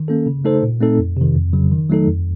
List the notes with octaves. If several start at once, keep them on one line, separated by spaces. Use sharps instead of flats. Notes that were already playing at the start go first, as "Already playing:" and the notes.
Already playing: D#3
A#3 C#4 A4
C#3
A3 D#4 A4 C5
A#2
A3 C4 D#4 A4
F2
C3 D#3
F2
C#3 F#3
D#3
F#3 A3 D#4 A4
F2